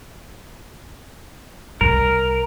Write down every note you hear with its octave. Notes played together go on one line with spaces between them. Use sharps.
C2 A#4